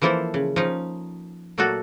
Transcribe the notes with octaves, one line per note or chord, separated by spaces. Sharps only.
E3 F3 A#3 E4 A4 C5
C#3
F3 C#4 D#4
A#2 F#3 A3 A#3 F#4 A4